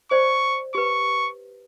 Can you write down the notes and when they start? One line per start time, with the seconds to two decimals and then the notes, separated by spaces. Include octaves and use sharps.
0.11 C5 D5 C#6
0.75 G4 B4 C#6